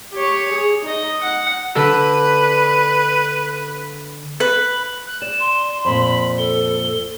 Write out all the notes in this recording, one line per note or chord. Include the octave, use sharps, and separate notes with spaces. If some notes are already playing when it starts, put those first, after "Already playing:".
G4 C#5
G#4
D#4 D#5
F#5
D3 A4 B4
B4
F#6
D5 E7
C6
F2 A#2 B5
A4 G7